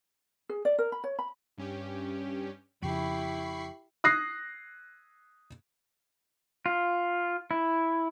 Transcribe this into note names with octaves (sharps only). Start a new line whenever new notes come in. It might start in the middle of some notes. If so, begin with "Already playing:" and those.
G#4
D5
A#4
B5
C#5
B5
G2 C#4 G4
F2 C#3 E4 G4 B5 C#6 C7
D#6 F#6 A#6 C7
F4
E4